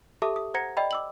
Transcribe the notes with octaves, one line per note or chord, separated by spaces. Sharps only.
G4 A4 E5 A5 D6 D#6
D#6
C5 F#5 A#5 G#6 A#6 C#7
D5 D#5 G5 B5
D6 E6 F#7